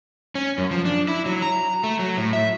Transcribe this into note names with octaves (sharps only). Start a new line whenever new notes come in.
C#4
F#2
F3
D4
E4
F#3
A#5
A3
F#3
A2
E5